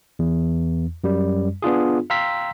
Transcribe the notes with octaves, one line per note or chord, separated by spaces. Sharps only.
E2
F#2 G3
B3 D4 F4 G#4
F5 G5 A#5 C6 E6 B6